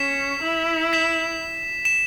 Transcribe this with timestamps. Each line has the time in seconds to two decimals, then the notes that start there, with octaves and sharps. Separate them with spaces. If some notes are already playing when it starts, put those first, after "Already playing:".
Already playing: C#4 B6 E7
0.42 E4
0.93 B6 E7
1.85 E7